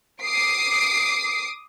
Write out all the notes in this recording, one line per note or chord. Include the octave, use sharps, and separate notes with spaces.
D6 D#6 C7 D7